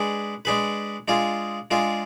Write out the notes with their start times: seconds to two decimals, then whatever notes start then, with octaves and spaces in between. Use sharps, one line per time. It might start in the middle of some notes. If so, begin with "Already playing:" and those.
Already playing: G#3 D4 G#4 B4
0.45 G#3 D4 G#4 B4
1.08 G#3 D4 F4 G#4
1.71 G#3 D4 F4 G#4